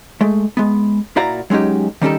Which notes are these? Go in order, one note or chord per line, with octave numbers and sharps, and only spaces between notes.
G#3 A3
G#3 B3
A#2 E4 F#4 D5 F5 A#5
F#3 G#3 C#4 D#4 G4
D#3 G3 C#4 D#4 G4 A4